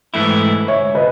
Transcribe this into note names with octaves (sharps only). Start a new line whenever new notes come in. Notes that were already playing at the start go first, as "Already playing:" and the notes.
G#2 E3 A3 E4
C#5 E5
B4 D#5